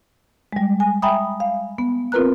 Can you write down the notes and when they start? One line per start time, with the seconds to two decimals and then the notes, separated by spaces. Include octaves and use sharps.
0.53 G3 G#3
0.80 G#5
1.02 E5 G5 G#5 A#5 B5 D#6
1.40 F5
1.78 B3
2.12 C4 F4 A#4 B4 A#5 F#6